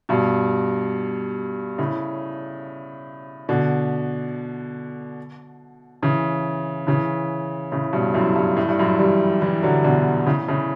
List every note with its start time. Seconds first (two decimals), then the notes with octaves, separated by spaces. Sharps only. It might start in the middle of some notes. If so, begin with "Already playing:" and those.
0.09 G2 B2
1.78 A2 C#3
3.49 B2 D3
6.02 C#3 E3
6.87 C#3 E3
7.72 A2 C#3
7.93 G2 B2
8.14 F#2 A2
8.36 G2
8.57 A2
8.69 G2
8.79 F#2 A2
8.99 E3 G3
9.41 E3 G3
9.63 D3 F#3
9.84 B2 D3
10.26 A2 C#3
10.48 A2 C#3